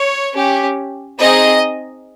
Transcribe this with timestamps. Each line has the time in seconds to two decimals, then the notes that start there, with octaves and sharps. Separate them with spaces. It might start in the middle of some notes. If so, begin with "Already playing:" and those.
Already playing: C#5
0.35 C#4 G4
1.19 C4 D#4 G#4 D#5